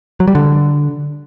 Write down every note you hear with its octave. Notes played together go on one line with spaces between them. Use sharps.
F#3
G3
D3